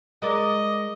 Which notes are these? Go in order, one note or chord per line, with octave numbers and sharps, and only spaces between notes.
G#3 A#4 D5 D#5